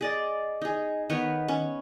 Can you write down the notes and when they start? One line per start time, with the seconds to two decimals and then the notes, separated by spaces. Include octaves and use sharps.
0.01 G#4 D5 D#5
0.61 D#4 G#4
1.10 D#3 B3 B4 C#5
1.48 C#4